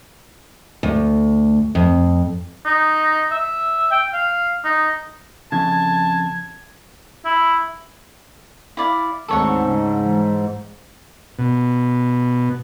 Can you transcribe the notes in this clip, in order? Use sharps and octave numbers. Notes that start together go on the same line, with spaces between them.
D2
F2
D#4
E5
G5
F5
D#4
F2 C#3 A5 G#6
E4
E4 D5 F5
D2 G#2 D#3 C4 A4 C#5 F#5
C#3 G#3
E3 G#3
B2